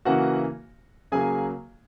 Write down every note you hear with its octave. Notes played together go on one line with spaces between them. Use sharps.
C#3 E3 A#3 F#4 F#5
C#3 F#3 A#3 G#4 G#5